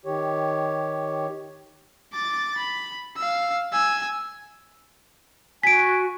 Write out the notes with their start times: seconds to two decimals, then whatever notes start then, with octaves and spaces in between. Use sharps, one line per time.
0.05 D#3 G4 C#5
2.13 D6 A6
2.58 B5
3.17 F5 E6
3.73 G#5 E6
5.63 F#4 G#5 B6 D7